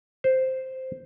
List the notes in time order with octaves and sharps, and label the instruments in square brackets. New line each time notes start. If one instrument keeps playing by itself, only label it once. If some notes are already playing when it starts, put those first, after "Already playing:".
[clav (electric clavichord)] C5